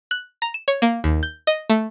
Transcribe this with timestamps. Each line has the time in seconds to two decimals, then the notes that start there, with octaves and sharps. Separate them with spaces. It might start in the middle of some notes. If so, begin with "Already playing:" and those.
0.11 F#6
0.42 A#5
0.54 E7
0.68 C#5
0.82 A#3
1.04 D#2
1.23 G6
1.47 D#5
1.70 A3